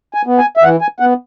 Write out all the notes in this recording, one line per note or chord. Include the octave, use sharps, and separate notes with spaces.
G#5
B3
G#5
E5
E3 F#5
G#5
B3 F#5